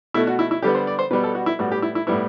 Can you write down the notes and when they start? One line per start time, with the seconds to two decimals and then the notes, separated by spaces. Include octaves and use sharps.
0.14 B2 A3 E4
0.27 F#4
0.39 E4
0.51 E4
0.62 D3 G3 B3 G4
0.75 C5
0.87 D5
0.99 C5
1.11 B2 G3 B3 B4
1.23 A4
1.35 F#4
1.46 E4
1.59 A2 G3 B3 F#4
1.72 G4
1.82 E4
1.95 E4
2.07 A2 G3 B3 E4